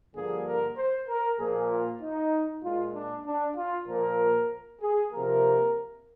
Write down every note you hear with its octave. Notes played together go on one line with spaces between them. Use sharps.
G2 D3 F3 A#3 G#4
A#4
C5
A#4
A#2 F3 A#3 G#4
F4
D#4
A#2 G#3 F4
D4
D4
F4
A#2 F3 A#3 A#4
G#4
C3 F3 A#3 A#4